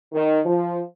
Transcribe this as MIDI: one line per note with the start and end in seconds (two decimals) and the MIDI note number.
0.13 0.39 51
0.45 0.79 53